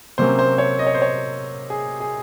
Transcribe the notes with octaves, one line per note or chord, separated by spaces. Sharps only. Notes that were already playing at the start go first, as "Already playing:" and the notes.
C3 F#3 A#3 C#4 C5
C5
C#5
D#5
C#5
C5
C#5
G#4
G#4